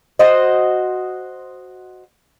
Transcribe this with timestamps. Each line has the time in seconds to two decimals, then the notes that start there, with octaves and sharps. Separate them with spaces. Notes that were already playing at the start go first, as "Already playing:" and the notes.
0.19 F#4 C5 D#5